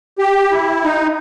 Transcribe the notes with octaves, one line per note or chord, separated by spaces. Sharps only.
G4
E4
D#4